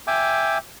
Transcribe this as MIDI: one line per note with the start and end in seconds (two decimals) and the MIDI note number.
0.07 0.58 76
0.07 0.58 79
0.07 0.58 80
0.07 0.58 86